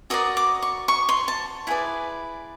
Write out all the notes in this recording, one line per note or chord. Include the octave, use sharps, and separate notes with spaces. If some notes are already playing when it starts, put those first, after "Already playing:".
F#4 A#4 D5 D#6
D6
C#6
C#6
C6
A5
E4 G#4 B4 D5 F#5